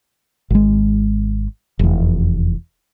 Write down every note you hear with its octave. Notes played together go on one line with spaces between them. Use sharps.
G#1 G#3
F1 E2